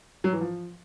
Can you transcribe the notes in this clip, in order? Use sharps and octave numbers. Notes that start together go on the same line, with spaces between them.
F#3
E3
F3